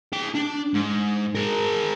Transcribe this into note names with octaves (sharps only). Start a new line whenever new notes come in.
G#4 G5
D4
G#2
G#4 A#4